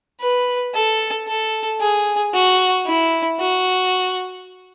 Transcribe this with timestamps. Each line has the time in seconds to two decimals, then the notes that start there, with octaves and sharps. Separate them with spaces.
0.21 B4
0.74 A4
1.28 A4
1.81 G#4
2.34 F#4
2.86 E4
3.40 F#4